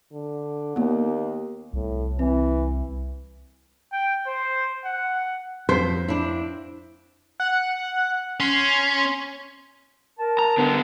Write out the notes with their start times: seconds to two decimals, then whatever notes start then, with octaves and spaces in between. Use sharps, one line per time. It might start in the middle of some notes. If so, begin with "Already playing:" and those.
0.12 D3
0.76 D#2 A#3 B3
1.73 C2 A2
2.19 E3 C4
3.92 G5
4.27 C5
4.85 F#5
5.69 F2 C5 G6 B6
6.08 D4 E4
7.40 F#5
8.40 C#4 C6
10.18 A#4 A5
10.39 A#5
10.58 D3 B3